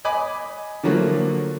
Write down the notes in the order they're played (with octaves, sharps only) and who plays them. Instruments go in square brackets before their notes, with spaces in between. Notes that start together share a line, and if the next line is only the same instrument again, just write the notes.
[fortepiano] D#5 G#5 B5 D6
D3 F3 F#3 A3 A#3